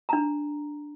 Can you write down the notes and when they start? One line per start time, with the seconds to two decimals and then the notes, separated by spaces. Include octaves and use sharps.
0.09 D4 A#5